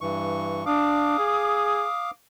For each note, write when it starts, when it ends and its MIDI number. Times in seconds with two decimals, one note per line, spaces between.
0.01 0.65 43
0.01 0.65 52
0.01 0.65 85
0.66 1.17 62
0.66 2.11 77
0.66 2.11 86
0.66 2.08 87
1.19 1.84 68